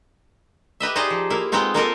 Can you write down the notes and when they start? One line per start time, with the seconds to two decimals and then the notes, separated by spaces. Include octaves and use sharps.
0.80 G4 B4 D#5 E5
0.96 D#4 G4 G#4 C5 D5 D#5
1.10 F3
1.30 A#3 E4 F4
1.52 G#3 B3 C4 D#4 F4
1.74 A#3 D#4 F4 A4 A#4 D#5